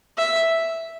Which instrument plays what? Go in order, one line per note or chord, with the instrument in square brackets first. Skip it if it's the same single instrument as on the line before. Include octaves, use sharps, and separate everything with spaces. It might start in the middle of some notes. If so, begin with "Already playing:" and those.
[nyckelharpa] E5